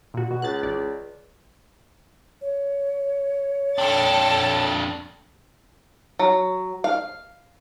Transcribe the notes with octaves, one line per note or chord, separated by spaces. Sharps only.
A#2 F#4
B2 F#4
C#2 F#6 A6
A1 D5
C#5
F2 D4 A4 G5 A6
F#3
F5